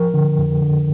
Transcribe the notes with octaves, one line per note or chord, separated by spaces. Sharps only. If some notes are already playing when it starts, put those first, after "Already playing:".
Already playing: F3 A#4
D3
F2
D3